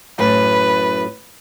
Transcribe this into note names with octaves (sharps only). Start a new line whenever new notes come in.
F#2 A2 B4